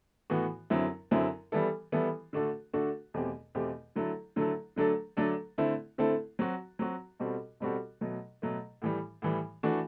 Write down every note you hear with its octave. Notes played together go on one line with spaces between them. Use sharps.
A2 E3 B3 F#4
F#2 D3 F#3 C4 E4
F#2 D3 F#3 C4 E4
E3 G3 B3 E4 A4
E3 G3 B3 E4 A4
D3 A3 D4 F#4 A4
D3 A3 D4 F#4 A4
E2 B2 A3 C4 G4
E2 B2 A3 C4 G4
D3 F#3 A3 E4 A4
D3 F#3 A3 E4 A4
D3 F#3 A3 D4 A4
D3 F#3 A3 D4 A4
D3 A3 C4 E4 A4
D3 A3 C4 E4 A4
F#3 C4 F#4
F#3 C4 F#4
B2 G3 C4 F#4 A4
B2 G3 C4 F#4 A4
B2 F#3 A3
B2 F#3 A3
A2 E3 G3
A2 E3 G3
E3 A3 D4 F#4